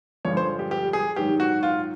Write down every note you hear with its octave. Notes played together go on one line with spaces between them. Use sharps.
G2 D3 F3 G#3 C#5
C5
G4
G4
G#4
G#2 D#3 F#3 G4
F#4
F4